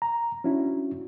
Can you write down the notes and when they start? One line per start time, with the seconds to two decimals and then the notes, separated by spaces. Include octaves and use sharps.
0.02 A#5
0.44 C#4 D4 E4 F#4